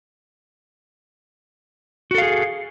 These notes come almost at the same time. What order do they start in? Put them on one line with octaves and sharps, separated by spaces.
F#4 A4 F5 G#4